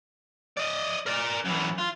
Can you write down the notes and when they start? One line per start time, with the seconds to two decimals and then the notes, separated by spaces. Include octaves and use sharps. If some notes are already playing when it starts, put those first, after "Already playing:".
0.57 D5 D#5
1.06 A#4 D5
1.45 F#2 E3
1.79 F4